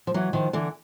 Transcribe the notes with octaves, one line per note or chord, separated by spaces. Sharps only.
F3
E3 F#3
D#3 F3
D3 E3